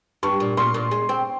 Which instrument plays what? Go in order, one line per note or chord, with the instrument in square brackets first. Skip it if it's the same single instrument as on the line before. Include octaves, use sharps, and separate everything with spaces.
[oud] G2 [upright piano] C#6
[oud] A#2
[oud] A#2 [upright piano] C6
[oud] A#2
G#3
C4